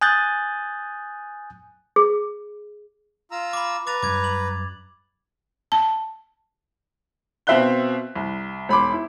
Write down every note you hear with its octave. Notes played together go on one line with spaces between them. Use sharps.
G#5 D#6 F#6 G6 A6
G#4
F4 A#5 E6
B5 D6
B4 A#5 D6 A6 F7
F#2 G3 D6 G#6
F#7
A5
B2 C4 E5 F5 F#6 G7
C2
E1 B5 C6 D6
E4